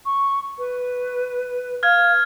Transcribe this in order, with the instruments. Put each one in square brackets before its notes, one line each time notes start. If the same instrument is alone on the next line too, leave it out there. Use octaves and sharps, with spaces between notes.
[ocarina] C#6
B4
[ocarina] F5 [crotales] F6 G#6